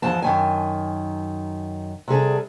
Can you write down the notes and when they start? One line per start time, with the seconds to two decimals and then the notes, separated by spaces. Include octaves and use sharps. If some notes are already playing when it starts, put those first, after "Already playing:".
0.02 E2 G#2 F3 A5
0.22 F#2 D#3 G#5
2.08 C3 G3 G#4 A4